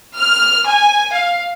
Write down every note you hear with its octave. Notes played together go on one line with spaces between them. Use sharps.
F6
G#5
F5